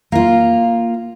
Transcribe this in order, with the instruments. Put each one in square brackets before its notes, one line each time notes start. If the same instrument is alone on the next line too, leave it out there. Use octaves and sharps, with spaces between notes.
[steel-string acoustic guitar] A#3 F4